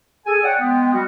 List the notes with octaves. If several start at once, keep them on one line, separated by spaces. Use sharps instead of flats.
G#4 A4 G#5
C#5 D5 F#5 G5
G#3 B3
G3 F#4